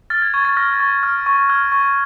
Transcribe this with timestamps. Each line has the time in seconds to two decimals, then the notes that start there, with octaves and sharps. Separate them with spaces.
0.10 F6 A6
0.22 G#6
0.34 C#6 G#6
0.45 A6
0.57 F6 A#6
0.80 C#6
1.03 F6
1.26 C#6
1.49 F6 G#6
1.72 C#6